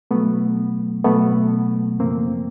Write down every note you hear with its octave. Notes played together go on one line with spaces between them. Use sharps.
B2 F#3 A3 B3
B2 F#3 A3 B3
F#2 C#3 F3 A#3 C4